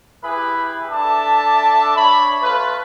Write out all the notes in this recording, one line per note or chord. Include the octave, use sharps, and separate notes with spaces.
E4 G4 G#4 B4 B5
D4 A4 E5 A5 D6
D4 C#5 B5
A3 F4 B4